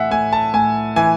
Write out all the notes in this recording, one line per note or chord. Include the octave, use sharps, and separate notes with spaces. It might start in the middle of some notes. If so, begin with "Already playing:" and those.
Already playing: A2 E3 E5 F#5 G#5
A2 G#5
A5
A2 G#5
E3 G#5